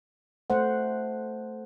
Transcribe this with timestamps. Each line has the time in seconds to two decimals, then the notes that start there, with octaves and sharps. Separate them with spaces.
0.50 A3 C5 F#5